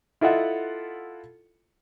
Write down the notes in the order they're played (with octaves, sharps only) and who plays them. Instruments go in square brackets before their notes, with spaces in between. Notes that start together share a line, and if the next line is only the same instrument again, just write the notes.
[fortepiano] E4 F4 A4 D#5 E5 F#5